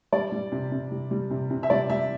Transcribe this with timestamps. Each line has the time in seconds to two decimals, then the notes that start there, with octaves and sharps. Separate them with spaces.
0.12 G3 D5
0.32 G3
0.52 C3
0.72 C3
0.91 G3
1.11 G3
1.30 C3
1.50 C3
1.63 E5
1.70 G3 D5
1.89 G3 E5